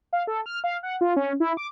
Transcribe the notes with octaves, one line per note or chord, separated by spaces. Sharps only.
F5
A4
F6
F5
F#5
F4
C#4
E4
D6